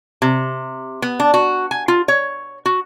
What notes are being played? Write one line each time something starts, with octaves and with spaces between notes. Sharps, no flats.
C3
B3
D4
F#4
G#5
F4
C#5
F#4